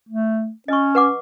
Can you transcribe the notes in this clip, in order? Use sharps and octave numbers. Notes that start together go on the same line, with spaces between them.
A3
C#4 D#5 C#6
B4 F#5 D6